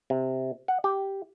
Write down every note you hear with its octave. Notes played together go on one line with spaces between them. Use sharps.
C3
F#5
G4